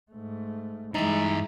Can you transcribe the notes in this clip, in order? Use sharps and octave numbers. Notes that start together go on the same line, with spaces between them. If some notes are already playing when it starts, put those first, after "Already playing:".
G#2 A3
G2 E3 G#3 D#4 E4 A#5